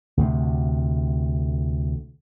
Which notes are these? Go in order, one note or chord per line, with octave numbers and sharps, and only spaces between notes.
D2 A2 C3